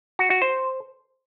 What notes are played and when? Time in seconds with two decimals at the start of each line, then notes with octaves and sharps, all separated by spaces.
0.19 F#4
0.30 F#4
0.42 C5